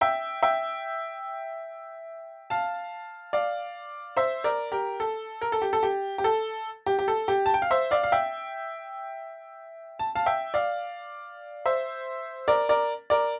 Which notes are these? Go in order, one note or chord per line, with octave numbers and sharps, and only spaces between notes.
E5 G5
E5 G5
F5 A5
D5 F5
C5 E5
A#4 D5
G4 A#4
A4
A#4
A4
G4
A4
G4
G4
A4
G4
G4
A4
G4
A5
G5
F5
C5 E5
D5 F5
F5
E5 G5
A5
F5 A5
E5 G5
D5 F5
C5 E5
A#4 D5
A#4 D5
A#4 D5